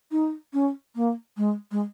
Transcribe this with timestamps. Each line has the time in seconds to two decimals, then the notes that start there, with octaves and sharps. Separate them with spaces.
0.12 D#4
0.54 C#4
0.96 A#3
1.37 G#3
1.72 G#3